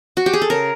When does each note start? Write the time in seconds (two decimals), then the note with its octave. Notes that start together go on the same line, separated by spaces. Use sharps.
0.17 F#4
0.26 G4
0.33 G#4
0.42 A4
0.50 C#3 A#4